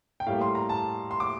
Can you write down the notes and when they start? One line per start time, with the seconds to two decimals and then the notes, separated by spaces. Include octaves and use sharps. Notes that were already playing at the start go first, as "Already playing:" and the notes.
0.20 G5
0.27 A2 G3 A#3 F5
0.41 C6
0.55 A#5
0.69 A5
1.11 C6
1.20 D6